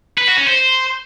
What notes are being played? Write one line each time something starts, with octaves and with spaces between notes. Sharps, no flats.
B4
F#4
C#4
C5